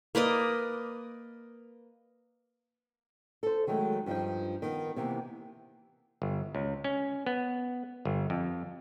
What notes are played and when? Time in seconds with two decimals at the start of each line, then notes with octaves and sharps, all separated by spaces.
0.15 A#3 B4 D5 D#5
3.43 A4 C5
3.67 D#3 F#3 G#3 A3
4.06 G2 F3 D#4 G5
4.62 D#3 B3
4.96 C3 E3 A#3 B3
6.22 G1
6.55 C#2
6.84 C#4
7.26 B3
8.05 G1
8.30 F2